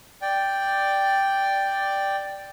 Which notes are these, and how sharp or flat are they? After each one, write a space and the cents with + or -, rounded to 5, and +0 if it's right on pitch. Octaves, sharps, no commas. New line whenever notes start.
D5 +0 G5 +0